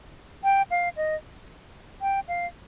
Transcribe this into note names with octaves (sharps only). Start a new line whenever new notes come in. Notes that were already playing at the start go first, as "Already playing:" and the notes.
G5
F5
D#5
G5
F5